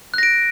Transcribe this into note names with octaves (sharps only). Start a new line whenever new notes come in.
F#6 A#6 D7